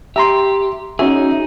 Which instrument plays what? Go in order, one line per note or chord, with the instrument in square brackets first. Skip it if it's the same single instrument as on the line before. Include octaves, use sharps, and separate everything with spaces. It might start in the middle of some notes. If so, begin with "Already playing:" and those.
[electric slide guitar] G4 [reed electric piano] E5 A#5 C6
[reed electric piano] C#4 F#4 E5 [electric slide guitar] D#4 G#4